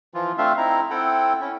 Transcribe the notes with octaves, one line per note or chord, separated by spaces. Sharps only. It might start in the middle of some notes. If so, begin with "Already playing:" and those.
E3 F3 F4
A3 C4 D4 F4 E5 F5
C4 D#4 E4 A#5
C4 E4 A4 F#5 G5
C#4 E4